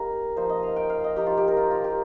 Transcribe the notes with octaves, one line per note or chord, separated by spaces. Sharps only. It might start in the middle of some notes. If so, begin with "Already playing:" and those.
Already playing: A#3 D#4 G4 A#4
F3 A#3 D#4 C5
D#5
F5
G5
F5
D#5
F3 D#4 G4
F4
G4
A#4
F4
F4
G4